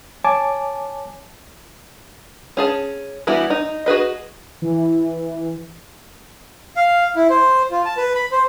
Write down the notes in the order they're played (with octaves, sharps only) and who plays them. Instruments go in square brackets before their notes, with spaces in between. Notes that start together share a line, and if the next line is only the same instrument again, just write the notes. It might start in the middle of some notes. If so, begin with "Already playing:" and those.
[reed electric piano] C#5 G#5 A5 D6
[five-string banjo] C#4 G#4 A5
E3 G3 B3 E4 F#4
D#4
F#4 G#4 B4 D#5
[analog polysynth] E3
[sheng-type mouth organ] F5
E4
C5
F4
A5
B4
B5
C5